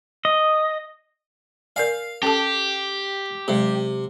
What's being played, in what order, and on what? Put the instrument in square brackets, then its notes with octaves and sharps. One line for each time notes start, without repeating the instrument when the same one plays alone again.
[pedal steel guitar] D#5
[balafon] A#4 D5 G#5 [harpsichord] F5
[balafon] C#4 A4 A5 [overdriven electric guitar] G4
[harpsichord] C3 [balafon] F#3 G#3